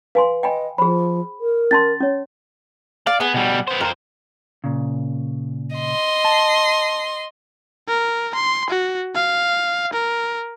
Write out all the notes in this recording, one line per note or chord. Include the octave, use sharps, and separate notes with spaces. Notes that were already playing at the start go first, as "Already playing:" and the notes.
B4 F5 G#5 C6
D#5 G5 G#5 B5
F3 G#4 C5 B5
A#4
C#4 A5 C6 A6
C#4 C#5
D5 F5
B3 G#4 F#5 G#5
B2 G3
B3 C5
F2 A#4 C5
A#2 C#3
D#5 C6
A5
A#4
C6
F#4
F5
A#4